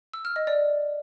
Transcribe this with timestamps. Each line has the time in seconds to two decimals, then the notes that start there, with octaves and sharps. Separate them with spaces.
0.13 E6
0.25 F6
0.36 D#5
0.47 D5